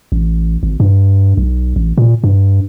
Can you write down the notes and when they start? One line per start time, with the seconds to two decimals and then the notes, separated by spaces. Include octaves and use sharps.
0.12 A1
0.63 G#1
0.80 G2
1.37 B1
1.76 A1
1.98 A#2
2.24 G2